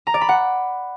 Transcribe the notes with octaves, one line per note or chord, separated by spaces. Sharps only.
A#5
D5
B5
F#5